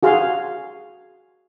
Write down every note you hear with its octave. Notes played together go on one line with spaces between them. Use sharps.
F#4 G#4 F5 C6